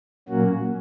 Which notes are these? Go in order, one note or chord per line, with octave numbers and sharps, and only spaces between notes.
A#2 F#3 A#3 C#4 F#4